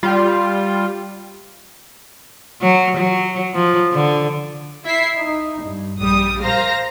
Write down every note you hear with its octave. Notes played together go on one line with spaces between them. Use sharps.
G3 F4
F#3
F#3
F3
D3
E4 E5 B6 C7
D#4
G2
A#1 G3 D#6
A#4 C5 F5 A#5 A#6